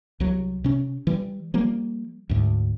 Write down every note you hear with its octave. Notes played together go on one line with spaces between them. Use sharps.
C2 F#3
C3 C#4
E3 G3
F3 G3 A#3
D2 G#2